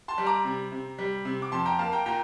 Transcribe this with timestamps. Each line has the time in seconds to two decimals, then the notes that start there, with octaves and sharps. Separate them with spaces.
0.08 A5 C6
0.18 G3
0.26 A#5 D6
0.45 C3
0.72 C3
0.99 G3
1.25 C3
1.42 D6
1.52 F2 A5 C6
1.66 G5 A#5
1.79 A#3 F5 A5
1.92 G5 A#5
2.06 A#2 G5 A#5